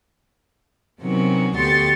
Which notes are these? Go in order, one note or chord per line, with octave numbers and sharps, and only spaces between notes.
C3 D#3 F#3 B3 C#4 F#4
D2 B3 G4 C6 C#6 A6